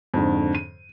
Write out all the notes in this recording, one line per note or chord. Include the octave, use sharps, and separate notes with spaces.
F2 G#2 D3
D#7